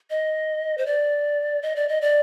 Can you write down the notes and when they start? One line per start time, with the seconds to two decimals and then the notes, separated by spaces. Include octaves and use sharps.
0.10 D#5
0.78 C5
0.86 D5
1.62 D#5
1.76 D5
1.88 D#5
2.01 D5